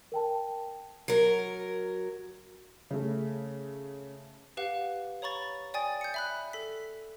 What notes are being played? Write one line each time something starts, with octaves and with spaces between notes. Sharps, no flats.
A#4 G5 A5
F#3 A#4
C#3 A3
G4 B4 F5 F#5
C#5 A#5 B5 C#6 A6
D5 G5 G#5 D#6 A6
G6 C#7
E5 B5 F#6
A4 B6